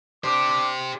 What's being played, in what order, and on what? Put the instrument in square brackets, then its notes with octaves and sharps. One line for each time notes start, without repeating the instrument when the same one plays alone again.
[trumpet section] D4 D6 [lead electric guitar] G4 C5